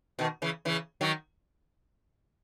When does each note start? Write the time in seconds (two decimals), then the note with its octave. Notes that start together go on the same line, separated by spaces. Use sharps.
0.19 B2 D#3
0.42 C#3 E3
0.65 C#3 E3
1.01 D#3 F#3